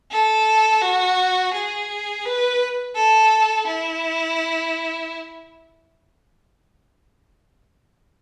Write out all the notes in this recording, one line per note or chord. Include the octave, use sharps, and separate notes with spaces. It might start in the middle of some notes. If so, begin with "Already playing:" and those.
A4
F#4
G#4
B4
A4
E4